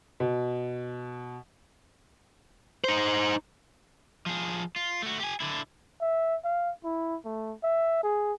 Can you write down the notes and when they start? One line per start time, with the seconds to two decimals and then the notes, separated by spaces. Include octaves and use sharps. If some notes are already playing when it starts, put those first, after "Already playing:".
0.20 B2
2.84 D#4 C5
4.26 F3 G#4
4.76 F4
5.02 A3 F#4
5.20 G4 G#5
5.40 D3 E4
6.01 E5
6.44 F5
6.84 E4
7.25 A3
7.63 E5
8.03 G#4